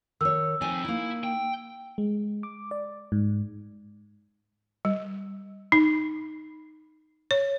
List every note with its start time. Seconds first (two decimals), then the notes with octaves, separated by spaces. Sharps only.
0.21 D#3 C#5 E6
0.61 F3 C4 D#4 G#5
0.85 A#3 D#4 E4
1.24 G5
1.98 G#3
2.43 D6
2.71 D5
3.12 G#2
4.85 G3
5.72 D#4
7.31 C#5